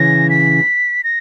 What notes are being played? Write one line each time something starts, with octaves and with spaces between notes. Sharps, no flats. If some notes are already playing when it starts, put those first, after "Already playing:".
Already playing: C#3 E3 A#6
B6
A#6